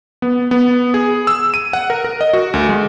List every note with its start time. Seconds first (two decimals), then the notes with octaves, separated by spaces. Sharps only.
0.22 B3
0.51 B3
0.94 G#4
1.27 E6
1.54 D#7
1.73 F#5
1.90 A#4
2.04 A#4
2.21 D#5
2.33 F#4
2.54 D2
2.69 G#3